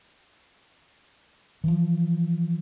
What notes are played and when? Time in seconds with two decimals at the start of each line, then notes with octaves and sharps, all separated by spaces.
1.64 E3 F3